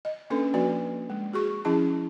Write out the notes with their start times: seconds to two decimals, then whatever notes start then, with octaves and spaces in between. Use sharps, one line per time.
0.05 D#5
0.30 A#3 C#4 D4 A4 B4
0.54 F3 A#3 F#4 B4 D5
1.10 G#3
1.33 F#4 G#4 C#6
1.65 F3 C#4 E4 G#4 A5